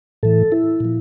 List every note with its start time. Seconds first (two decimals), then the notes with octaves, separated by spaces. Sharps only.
0.23 A2 E3 A4
0.52 E4
0.80 A#2 F3